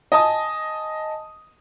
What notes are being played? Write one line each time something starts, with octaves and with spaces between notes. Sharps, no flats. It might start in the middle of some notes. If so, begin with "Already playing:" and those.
D#5 G#5 A5 D#6